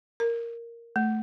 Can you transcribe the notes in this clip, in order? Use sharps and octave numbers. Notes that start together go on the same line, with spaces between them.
A#4
A3